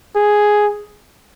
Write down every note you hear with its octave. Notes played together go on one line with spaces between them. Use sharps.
G#4